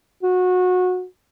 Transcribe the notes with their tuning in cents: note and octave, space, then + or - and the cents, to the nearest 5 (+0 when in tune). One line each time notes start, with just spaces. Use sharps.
F#4 -20